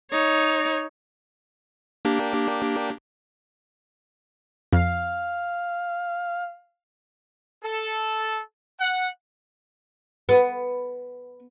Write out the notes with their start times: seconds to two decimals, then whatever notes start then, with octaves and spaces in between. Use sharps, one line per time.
0.11 D#4 C#5
2.05 A#3 D4 G4
4.73 F2 F5
7.63 A4
8.80 F#5
10.29 B3